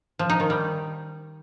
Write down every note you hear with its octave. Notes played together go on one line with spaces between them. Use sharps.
F3
D#4
D#3
G3